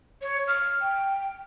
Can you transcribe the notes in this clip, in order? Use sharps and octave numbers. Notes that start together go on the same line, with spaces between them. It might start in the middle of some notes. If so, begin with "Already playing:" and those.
C#5
F6
G5